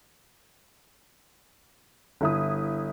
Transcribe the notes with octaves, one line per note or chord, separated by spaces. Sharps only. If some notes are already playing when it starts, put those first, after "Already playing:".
G1 E4 D#6